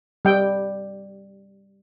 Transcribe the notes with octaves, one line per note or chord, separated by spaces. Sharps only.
G3 G5